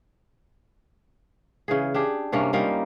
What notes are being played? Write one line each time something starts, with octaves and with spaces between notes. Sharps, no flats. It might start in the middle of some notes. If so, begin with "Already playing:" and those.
C#3 E3 G#4
D4 G4 G#4
G2 C3 A#3 C#4
G3 A#3 D#4 F4